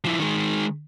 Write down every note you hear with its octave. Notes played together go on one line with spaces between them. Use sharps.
F3 E4
D#3 G#3